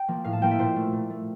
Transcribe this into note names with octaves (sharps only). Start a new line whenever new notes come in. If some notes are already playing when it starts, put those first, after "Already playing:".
Already playing: G5
F3 A#3
A2 F5
A5
F3 A#3 G5
E5
A#2 C5
A3
A#2
A3